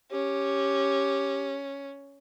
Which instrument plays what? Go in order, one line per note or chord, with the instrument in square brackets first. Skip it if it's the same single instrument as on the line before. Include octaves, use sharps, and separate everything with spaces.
[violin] C#4 [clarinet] G4